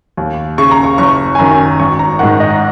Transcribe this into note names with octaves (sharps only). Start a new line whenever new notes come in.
D#2
C#3 C#6
A#5
C#6
F#1 C#6
G#5
F#2 D#3 A#5
G#1 C#6
A#5
G#2 D#3 F#5
D#5